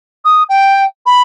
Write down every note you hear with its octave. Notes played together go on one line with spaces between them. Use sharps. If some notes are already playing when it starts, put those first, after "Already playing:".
D#6
G5
B5